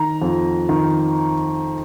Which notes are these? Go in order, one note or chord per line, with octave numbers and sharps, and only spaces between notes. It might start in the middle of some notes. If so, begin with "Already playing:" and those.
Already playing: D#3 A#5
F2
D#3